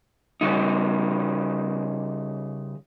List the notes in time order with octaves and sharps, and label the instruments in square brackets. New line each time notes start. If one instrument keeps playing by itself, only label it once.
[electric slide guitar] C#3 G3 D#4